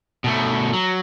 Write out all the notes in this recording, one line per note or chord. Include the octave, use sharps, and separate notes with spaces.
B2 A3
F#3